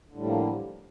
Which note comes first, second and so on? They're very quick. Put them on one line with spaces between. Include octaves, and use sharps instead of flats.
D3 A2 G3 F3 A#3